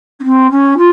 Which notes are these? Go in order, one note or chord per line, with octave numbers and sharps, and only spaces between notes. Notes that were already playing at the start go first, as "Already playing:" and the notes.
C#4
C4
C#4
F4